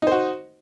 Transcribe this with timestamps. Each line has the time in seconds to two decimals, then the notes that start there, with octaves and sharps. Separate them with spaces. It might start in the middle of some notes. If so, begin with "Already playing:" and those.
0.02 D#4
0.07 C5
0.12 F#4